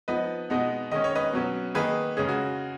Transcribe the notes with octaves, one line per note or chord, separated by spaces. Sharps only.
F3 B3 D#4 B4 D#5
B2 G#3 B3 D#4
D#3 G#3 C#4 D#5
C#5
B4 D#5
B2 F#3 C#4
D#3 A#3 D#4 G#4 B4
C#3 G#3 C#4 G#4
F#4